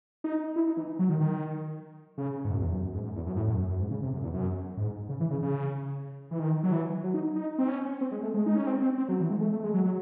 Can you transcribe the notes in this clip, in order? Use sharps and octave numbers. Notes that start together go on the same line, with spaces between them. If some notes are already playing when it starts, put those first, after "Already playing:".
D#4
E4
D#4
E3
F#3
D#3
D#3
C#3
G#2
F#2
E2
F#2
F#2
G#2
F#2
E2
F#2
A2
F#2
F#2
F#2
G#2
C#3
C3
F#2
E2
F#2
G#2
C#3
E3
C#3
C#3
E3
D#3
F#3
E3
F#3
D#4
D#4
C4
C#4
C4
G#3
A3
G#3
D#4
C#4
C4
C4
C4
F#3
E3
G#3
A3
A3
G#3
F#3
F#3